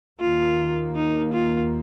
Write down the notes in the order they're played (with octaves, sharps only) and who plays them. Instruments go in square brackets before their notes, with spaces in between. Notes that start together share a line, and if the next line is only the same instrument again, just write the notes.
[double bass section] D#2 D#3 A#3 [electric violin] F4
[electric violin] D#4
F4